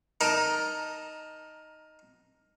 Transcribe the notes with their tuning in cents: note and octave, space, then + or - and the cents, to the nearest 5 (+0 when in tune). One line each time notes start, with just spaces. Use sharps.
D#4 +0 A#4 +15 A5 +0